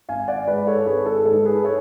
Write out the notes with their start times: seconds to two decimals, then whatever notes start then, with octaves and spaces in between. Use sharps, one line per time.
0.09 G#1 F5 G#5
0.28 D5 F#5
0.47 G#2 G#3 B4 D5
0.67 A4 C#5
0.86 G#1 G#4 B4
1.06 A4
1.25 G#2 G#3 A4
1.45 G#4 B4
1.64 A4 C#5